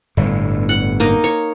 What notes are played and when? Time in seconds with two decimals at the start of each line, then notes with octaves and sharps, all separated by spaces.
0.17 G1 A2
0.69 F#5
1.00 A#3 D#4
1.24 C#5